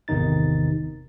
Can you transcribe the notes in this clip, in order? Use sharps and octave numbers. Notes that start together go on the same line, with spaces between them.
G#1 E2 C3 D#3 D#4 A6